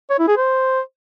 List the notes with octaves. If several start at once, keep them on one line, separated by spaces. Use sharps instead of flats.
C#5
E4
G#4
C5